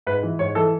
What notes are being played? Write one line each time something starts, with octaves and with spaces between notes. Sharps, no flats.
G#2 B4
E3
G#2 C#5
E3 A4